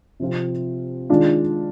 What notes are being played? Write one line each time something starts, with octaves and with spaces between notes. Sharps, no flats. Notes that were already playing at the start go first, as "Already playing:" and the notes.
C3 F3 C4 F4
D#3 G#3 D4 F4